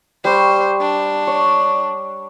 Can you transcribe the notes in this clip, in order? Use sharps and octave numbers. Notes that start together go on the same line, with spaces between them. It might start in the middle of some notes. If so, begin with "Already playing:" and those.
G3 C5 C#6
D4
C#5